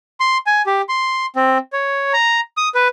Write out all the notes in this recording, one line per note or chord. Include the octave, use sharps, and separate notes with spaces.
C6
G#5
G4
C6
C4
C#5
A#5
D#6
B4